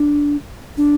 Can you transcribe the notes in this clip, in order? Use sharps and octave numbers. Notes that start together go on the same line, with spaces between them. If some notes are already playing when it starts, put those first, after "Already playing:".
Already playing: D4
D4